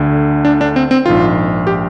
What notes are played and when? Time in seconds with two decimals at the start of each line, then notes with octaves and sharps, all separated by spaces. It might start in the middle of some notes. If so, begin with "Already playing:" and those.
Already playing: D2 D3
0.45 D4
0.61 D4
0.76 C4
0.91 C4
1.06 A#1 G#2 D#3 F4
1.67 G4